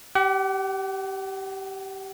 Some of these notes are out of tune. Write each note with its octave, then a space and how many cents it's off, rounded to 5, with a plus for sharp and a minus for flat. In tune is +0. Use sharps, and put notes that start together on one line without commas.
G4 -15 F#5 +40